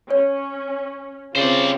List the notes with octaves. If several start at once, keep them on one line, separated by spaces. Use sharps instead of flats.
C#4 C#5
C#3 C4 F4 C5 D5